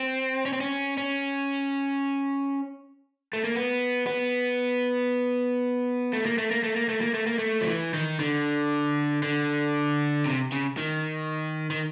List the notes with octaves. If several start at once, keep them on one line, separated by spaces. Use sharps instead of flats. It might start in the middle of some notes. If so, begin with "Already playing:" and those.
Already playing: C4
C#4
C4
C#4
C#4
A3
A#3
B3
B3
A3
A#3
A3
A#3
A3
A#3
A3
A#3
A3
A#3
A3
F3
E3
D#3
D3
D3
C3
C#3
D#3
D#3